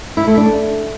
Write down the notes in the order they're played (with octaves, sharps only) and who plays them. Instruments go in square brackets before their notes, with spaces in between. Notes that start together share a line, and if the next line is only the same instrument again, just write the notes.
[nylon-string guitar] E4
A3
D4